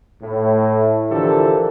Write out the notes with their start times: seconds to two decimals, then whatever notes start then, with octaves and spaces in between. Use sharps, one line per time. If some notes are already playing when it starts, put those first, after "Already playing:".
0.22 A2
1.11 D3 E3 F3 G4 A4 A#4